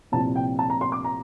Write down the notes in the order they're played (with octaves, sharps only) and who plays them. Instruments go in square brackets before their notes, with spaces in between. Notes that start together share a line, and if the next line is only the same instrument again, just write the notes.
[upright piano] C2 A#2 F3 C4 A5
G5
A5
A#5
C6
D6
A#5